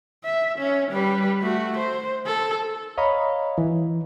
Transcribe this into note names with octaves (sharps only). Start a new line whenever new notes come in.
E5
C#4
G3 B4
A3 F#4
C5
A4
C#5 D#5 F5 A#5 B5
E3